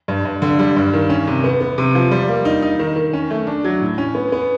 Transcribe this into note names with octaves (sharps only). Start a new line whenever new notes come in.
G2
G2
D3
G3
G2
D#3
C#4
C3
B3
B3
C3
F3
G3
A#3
D#4
D#4
D#3
D#3
C#4
A3
D4
F#3
A2
C#4
B3
B3